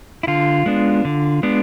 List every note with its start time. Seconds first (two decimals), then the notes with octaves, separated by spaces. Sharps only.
0.23 E4
0.27 D3 F4
0.66 G#3 B3 D4
1.05 D3
1.43 G#3 B3 D4